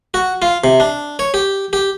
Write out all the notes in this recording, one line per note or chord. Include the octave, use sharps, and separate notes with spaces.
F#4
F4
C3
D4
C#5
G4
G4